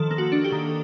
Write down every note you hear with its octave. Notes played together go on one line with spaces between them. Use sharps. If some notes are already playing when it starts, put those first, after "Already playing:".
Already playing: D#3 F3 A4
A#3
F#4
D4
G4
D#3